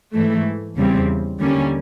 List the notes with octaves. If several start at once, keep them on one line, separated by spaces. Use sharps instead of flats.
G#2 E3 A3
E2 C#3 E3 G3 C4
D#2 D3 G3 A#3 C#4